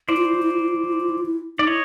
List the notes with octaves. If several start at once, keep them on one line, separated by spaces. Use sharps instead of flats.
E4 C5 D5
F4
E4
F4
E4
F4
E4
F4
E4
F4
E4
F4
E4
F4
E4
D#4 D5
E4 C#5 D#5